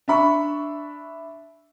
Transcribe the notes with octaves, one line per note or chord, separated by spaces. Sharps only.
D4 E5 B5 C#6